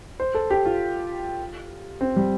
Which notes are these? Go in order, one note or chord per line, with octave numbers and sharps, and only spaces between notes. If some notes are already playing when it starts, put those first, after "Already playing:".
C5
A4
G4
F4
C4
G3